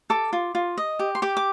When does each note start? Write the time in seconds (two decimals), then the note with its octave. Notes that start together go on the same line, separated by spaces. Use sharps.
0.10 A4 D6
0.33 F4
0.55 F4
0.77 D#5
0.99 G4
1.15 C6
1.22 G4 D6
1.37 D6